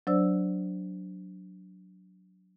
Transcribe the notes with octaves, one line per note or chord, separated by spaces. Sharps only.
F#3 D4 C5 D5 E6